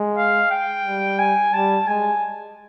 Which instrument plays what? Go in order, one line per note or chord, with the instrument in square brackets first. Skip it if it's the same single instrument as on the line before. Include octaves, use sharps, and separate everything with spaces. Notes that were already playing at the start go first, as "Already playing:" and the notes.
Already playing: [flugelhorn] G#3
[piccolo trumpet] F5
G5
[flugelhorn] G3
[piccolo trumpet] G#5
[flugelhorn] G3 [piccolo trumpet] A5
[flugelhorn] G#3 [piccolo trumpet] G#5